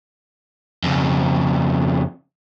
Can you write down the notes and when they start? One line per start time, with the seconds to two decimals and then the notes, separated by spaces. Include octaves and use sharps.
0.84 F2 C#3